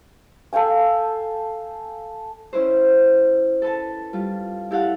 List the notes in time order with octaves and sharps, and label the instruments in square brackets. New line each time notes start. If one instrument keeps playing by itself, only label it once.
[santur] A4 F5 G5 G#5
[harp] C#4 E4 B4 C5
A4 B4 A5
G3 F4
E4 G4 A4 F5 F#5